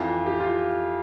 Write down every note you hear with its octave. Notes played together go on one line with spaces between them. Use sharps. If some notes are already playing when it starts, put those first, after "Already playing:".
Already playing: F2 E3 F4
G4
F4